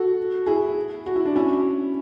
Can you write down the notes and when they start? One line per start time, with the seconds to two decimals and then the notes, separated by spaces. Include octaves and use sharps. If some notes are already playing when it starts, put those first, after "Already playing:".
Already playing: F#4 A4
0.46 E4 G#4
1.06 F#4
1.16 E4
1.26 D4
1.36 C#4 E4